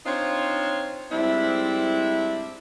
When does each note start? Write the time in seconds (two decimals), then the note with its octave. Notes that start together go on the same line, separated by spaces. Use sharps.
0.06 C4 D4 D#4 F4 C5 C#5
1.12 G#2 G3 C4 D4 E4